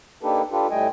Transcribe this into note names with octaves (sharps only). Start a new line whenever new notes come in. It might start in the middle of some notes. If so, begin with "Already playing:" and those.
A#3 D4 D#4 G4 A4 B4
D4 F4 G4 A4 B4
A2 G3 A3 D#5 G5 G#5